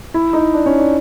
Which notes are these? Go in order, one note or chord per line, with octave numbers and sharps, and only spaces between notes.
E4
D#4
D4
C#4
D4